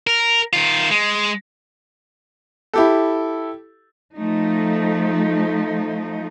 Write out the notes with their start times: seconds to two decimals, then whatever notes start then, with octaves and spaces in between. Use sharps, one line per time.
0.07 A#4
0.53 D#3 F4
0.91 G#3
2.73 E4 G4 A4
4.16 F3 A3 D#4